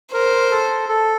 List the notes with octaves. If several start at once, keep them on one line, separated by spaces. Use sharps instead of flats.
A#4 C5
A4
A4